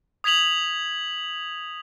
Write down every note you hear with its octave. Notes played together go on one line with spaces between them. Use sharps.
D#6 G#6 B6 F7 F#7